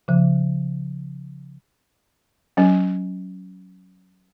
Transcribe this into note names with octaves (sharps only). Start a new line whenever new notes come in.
C#3 F3
F#3 C#4